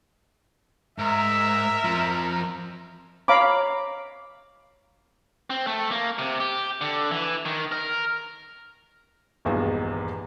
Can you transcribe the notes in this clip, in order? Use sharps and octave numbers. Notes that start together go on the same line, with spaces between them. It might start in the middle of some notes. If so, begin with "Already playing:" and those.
G#2 A#4 E5
F2 F3
C#5 F5 A#5 B5 D6
C4
A3
A#3
C3
G4
D3
E3
D#3
A#4
D#1 B1 E2 G2 G#3 G#5